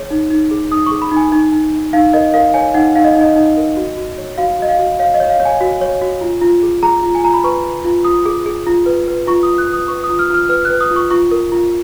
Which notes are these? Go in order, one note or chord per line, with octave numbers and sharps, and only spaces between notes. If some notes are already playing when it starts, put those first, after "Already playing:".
Already playing: G#4 C#5
D#4
D#4
G#4
D#4 D#6
G#4 C#6
B5
D#4 G#5
D#4
D#4
D#4
D#4 F5
A#4 D#5
A#4 F5
C#5 G#5
D#4 F#5
D#4 F5
D#5
D#4
D#5
D#4
A#4
F#4
F#4
C#5
F#4 F5
F#4 D#5
F5
F#4
C#5 F5
D#5
C#5
F5
C#5
G#5
F#4
C#5
F#4
F4
F4
G#4
G#4 A#5
F4
G#5
F4 A#5
B5
B4 C#6
B4
F4
F4 D#6
G#4
G#4
F4
B4
B4
F4 C#6
F4 D#6
F#6
B4
D#6
B4 C#6
D#6
F4
F6
F4 F6
B4 F6
B4 F#6
D#6
F4
C#6
F4 C#6
A#4
F4